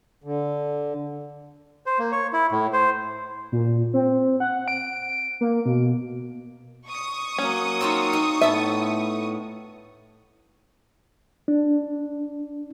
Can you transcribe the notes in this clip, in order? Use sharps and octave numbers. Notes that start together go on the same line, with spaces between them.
D3
C5
A#3
C#5
E4
A2
C5
A#2
C4
F#5
D7
A#3
B2
C#6 D#6
F#3 A#3 C#4
C4 D#4 F4
D#4
A2 B3 A4 E5
D4